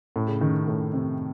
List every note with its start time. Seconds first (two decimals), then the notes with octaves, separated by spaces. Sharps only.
0.16 A2
0.28 C#3
0.41 D#3
0.68 A2
0.93 C3